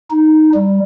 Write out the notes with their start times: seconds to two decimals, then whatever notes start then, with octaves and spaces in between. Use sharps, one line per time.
0.10 D#4
0.55 G3